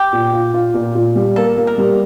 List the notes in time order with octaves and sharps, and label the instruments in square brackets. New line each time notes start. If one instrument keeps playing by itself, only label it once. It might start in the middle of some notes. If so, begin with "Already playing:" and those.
Already playing: [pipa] G4
[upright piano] A#2
F4
F4
A#2
A#2
G3
[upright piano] A#3 [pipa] A4
[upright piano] A#3
[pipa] A#4
[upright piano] G3